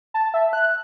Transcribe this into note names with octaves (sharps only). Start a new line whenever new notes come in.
A5
E5
F#6